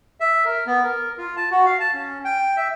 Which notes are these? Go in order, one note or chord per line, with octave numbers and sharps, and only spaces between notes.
E5
A#4
B3
A#4
F4
A5
F#4
F5
A5
C#4
G5
E5